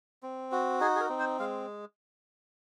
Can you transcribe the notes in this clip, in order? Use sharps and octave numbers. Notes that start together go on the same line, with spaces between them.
C4
F#4
D#4 G#4
G#4
A#4
C4
C5
G#3 F5